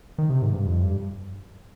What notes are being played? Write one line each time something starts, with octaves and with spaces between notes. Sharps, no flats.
D#3
C3
G#2
G2
F2
G2